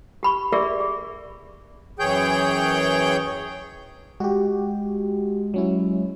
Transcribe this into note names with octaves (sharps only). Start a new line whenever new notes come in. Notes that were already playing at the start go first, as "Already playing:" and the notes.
G4 B5 C#6
G4 G#4 A#4 D5 E5 C#6
G#4
F#2 E3 G#4 C#5 G5 G6
G#3 F#4 G4
F#3 C#4 E4